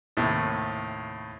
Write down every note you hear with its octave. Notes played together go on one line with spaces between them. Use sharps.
D#2 A2 C3